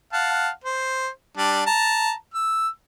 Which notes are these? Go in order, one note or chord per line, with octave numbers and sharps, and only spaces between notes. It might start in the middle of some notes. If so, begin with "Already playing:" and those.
F5 F#5 A5
C5
G3 D4
A5 A#5
E6